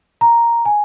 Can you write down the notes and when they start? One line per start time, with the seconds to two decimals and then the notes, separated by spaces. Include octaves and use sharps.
0.21 A#5
0.65 G#5